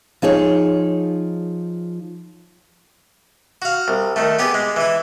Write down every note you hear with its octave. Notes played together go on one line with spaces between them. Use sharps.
F3 D#4 G#4 C#5
F#4 F5
C2
D#3 A3
B3 G4 G#4 D5
G#3
E3 E4